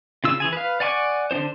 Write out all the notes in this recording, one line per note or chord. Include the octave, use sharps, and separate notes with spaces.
C#3 F4 E6
E3 G#4 G#5
B4 F5
D5 F#5 G#5 C#6 D6
D3 D4 D#4 C5